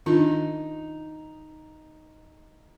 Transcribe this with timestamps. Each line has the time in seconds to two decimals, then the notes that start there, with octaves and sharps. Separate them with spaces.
0.06 D#3 D4 D#4 F4